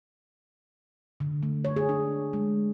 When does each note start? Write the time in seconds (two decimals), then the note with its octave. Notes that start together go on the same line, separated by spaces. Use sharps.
1.20 D3
1.43 A3
1.65 C#5
1.76 G#4
1.89 D4
2.33 G#3